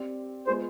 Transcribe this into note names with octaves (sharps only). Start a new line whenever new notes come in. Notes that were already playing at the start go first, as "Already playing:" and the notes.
Already playing: C4 G4 D5
G#3 B3 F4 G#4 C5